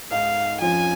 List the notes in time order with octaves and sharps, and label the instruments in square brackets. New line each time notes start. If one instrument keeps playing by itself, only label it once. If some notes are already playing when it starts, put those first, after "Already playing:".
[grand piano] G#2 G#3 D#4 [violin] F5
[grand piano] F2 F3 C#4 F4 [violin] G#5